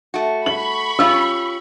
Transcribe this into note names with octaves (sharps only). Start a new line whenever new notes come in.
A3 F#4
B5 C#6 F#7
C#4 F4 G4 E6